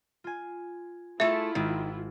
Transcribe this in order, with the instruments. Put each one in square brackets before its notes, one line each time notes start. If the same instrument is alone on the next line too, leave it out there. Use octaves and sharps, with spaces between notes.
[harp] F4 G#5
[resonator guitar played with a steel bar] A3 A4 [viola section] E4 F4 [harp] G#4 [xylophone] E5
[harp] G#1 E6 [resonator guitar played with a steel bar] D#3